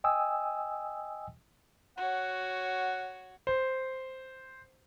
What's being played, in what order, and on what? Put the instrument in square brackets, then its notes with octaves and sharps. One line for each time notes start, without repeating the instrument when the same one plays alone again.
[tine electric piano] D#5 G5 G#5 D#6 E6
[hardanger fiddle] F#4 C#5 [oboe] F#5
[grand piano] C5